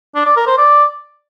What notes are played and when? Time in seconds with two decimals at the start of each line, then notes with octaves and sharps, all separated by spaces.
0.15 D4
0.26 D5
0.36 A#4
0.47 C5
0.58 D5